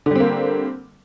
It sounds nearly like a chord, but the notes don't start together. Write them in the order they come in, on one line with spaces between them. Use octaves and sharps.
D3 G3 C4 A#3